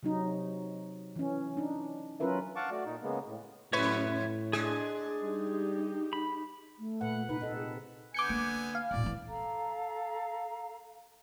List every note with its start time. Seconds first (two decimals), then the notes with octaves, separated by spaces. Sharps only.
0.03 C3 F#3 D#4
1.16 E3 C#4
1.57 D4 D#4
2.20 F#3 C#4 F4 A#4 B4 E5
2.56 F5 F#5 A5 C#6 D6
2.71 A3 F#4 D5
2.85 A#2 D#4
3.03 C#3 G#3 A#3 B3
3.26 A2
3.73 F2 A2 B4 C#5 E5 C#6
4.53 G#3 D4 G#4
5.23 G3 D#4 G4
6.13 B5
6.79 A3
7.01 A#2 B4 F#5
7.29 C3 D#4 B4
7.41 C4 D#4 A4 D#5
7.56 G#4
8.14 D3 B3 G#5 D6 G6 C#7
8.29 A#3
8.75 F5
8.91 E1 A2 D5
9.03 E3 B3
9.28 A4 F5 A#5